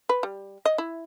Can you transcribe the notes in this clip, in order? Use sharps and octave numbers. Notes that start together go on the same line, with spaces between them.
B4
G3
D#5
E4